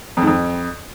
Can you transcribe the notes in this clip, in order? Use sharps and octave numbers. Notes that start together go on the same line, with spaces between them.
F2
G#2
F2